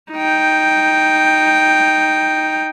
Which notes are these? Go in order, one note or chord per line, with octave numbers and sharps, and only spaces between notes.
D#4 G5